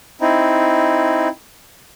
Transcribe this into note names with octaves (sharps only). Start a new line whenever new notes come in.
C4 D#4 E4